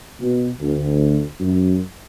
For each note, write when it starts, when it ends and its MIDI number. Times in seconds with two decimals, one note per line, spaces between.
0.21 0.50 47
0.60 1.23 38
1.40 1.80 42